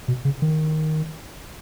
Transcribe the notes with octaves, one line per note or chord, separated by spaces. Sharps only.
B2
C#3
D#3